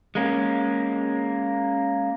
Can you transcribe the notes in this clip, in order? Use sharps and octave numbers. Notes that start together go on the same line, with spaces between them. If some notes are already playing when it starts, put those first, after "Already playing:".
G#3 A#3 C#4